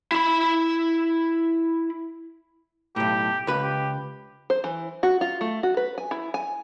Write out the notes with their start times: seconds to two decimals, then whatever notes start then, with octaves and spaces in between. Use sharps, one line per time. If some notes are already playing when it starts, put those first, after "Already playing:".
0.12 E4 B5
2.96 B1 A2 G4
3.47 C#2 B4
3.63 G4
4.50 C5
4.64 E3
5.03 F#4
5.21 F4
5.41 A3
5.63 F#4
5.77 B4
5.98 G#5
6.11 E4
6.34 G#5